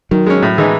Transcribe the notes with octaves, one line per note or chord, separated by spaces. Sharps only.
D#3 F#3
G#3 C#4
A2
E3 G#3 D#4